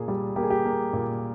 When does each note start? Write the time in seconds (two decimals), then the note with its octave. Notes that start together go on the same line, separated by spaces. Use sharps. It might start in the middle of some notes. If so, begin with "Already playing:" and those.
Already playing: A#2 A#3 G#4
0.08 G3
0.36 A#3 G4
0.43 G#4
0.50 G4
0.65 A#3
0.93 A#2